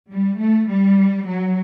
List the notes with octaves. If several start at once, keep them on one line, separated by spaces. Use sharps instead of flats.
G3
A3
G3
F#3